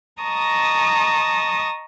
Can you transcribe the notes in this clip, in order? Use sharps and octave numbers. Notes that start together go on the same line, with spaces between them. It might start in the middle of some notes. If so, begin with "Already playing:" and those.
D#5 A5 A#5 C#6 D#6